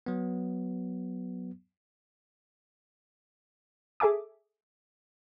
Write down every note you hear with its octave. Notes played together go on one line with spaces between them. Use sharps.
F#3 B3
G#4 A4 E5 G#5 D6